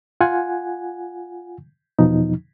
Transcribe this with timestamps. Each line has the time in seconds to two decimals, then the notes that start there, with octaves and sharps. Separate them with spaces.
0.21 F4 F#5 G#5
1.99 E2 B2 F3 D#4